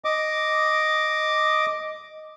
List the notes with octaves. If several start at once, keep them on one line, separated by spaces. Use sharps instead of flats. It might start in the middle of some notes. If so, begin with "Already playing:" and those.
D#5 D6